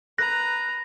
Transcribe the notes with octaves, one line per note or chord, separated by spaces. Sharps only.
B4 A#5 F#6 A#6